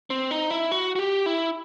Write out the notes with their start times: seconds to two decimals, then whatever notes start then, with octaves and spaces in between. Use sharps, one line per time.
0.10 C4
0.31 D#4
0.51 E4
0.71 F#4
0.96 F#4
0.99 G4
1.26 E4